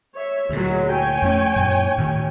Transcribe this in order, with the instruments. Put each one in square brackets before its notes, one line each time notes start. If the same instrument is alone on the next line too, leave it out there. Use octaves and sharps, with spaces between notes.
[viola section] C#5 E5
[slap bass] D2 A#2 [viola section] F#3 G#3
[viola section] C#5 G5 G#5
[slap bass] F2 A3 C#4
F#2 A#2
D2 A2 D#3